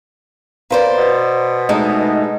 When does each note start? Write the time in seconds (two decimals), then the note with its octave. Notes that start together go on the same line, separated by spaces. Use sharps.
0.71 A#3 B4 C5 D5
0.98 B2
1.69 G#3 A3 D#4